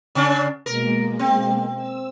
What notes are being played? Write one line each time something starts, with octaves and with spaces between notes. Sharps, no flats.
C#3 C#4 D4
B2 G#3 A#3 A#4
C4
E6